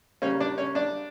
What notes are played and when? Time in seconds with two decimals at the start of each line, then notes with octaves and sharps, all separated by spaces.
0.22 C#3 G3 A#3 C#4 C#5
0.40 D4 D5
0.58 C#4 C#5
0.75 D4 D5